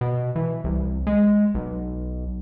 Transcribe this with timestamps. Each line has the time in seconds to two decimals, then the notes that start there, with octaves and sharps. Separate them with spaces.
0.01 B2
0.36 E3
0.64 C2
1.07 G#3
1.55 B1